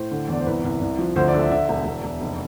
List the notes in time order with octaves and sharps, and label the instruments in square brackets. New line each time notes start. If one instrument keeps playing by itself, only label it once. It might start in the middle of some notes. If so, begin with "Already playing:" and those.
Already playing: [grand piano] A2 C5
D3
E2 D5
C5
C2 B4
C2
C2
F3
D2 C5
D5
D3
E5
D3 E5
E1
E1
E1
F1